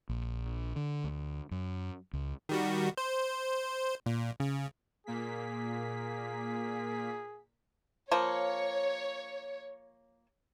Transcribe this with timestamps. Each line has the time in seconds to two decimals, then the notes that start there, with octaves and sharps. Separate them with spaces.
0.09 A#1
0.76 D3
1.04 D2
1.51 F#2
2.13 C#2
2.49 D#3 G3 F#4
2.97 C5
4.06 A#2
4.40 C#3
5.07 A#2 A#3 G#4 B6
8.11 F3 A#3 C#5